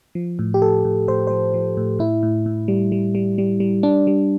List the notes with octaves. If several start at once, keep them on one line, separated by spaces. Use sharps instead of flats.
F3
A2
G4
A2 A4
A2
A2 C5
F3 C5
F3
A2
A2 E4
A2
A2
G3
G3
G3
G3
G3
G3 D4
G3